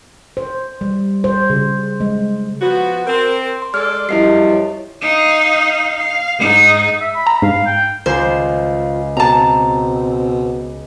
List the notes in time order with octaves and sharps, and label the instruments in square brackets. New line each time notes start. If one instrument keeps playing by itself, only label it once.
[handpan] C5
G3
C5
C#3
G#3
[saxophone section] F3 B3 F#4
C4 A#4
[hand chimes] C6
[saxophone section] G#3 A4 D5 [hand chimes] F6
[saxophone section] F#2 F3 G3 [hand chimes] E4 D#5 C7
[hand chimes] C#5
[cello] D#4 F5
F5
G#2 D#4
[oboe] E5
B5
[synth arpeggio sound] A#5
[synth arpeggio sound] G#2 [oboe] F5
[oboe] G5
[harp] C#2 [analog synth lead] F4 [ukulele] C5
[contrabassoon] B2 [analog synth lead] C4 [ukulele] A5 A#5